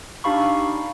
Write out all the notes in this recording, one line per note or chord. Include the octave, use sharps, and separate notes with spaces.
D4 D#4 G4 F5 B5 C#6